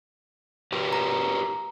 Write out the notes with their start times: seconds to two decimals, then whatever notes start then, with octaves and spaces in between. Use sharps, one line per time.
0.72 G4 A#4 B4
0.93 A#5